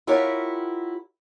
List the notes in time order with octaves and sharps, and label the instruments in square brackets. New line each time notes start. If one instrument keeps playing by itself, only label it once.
[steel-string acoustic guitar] E4 F4 G4 A#4 C#5 F#5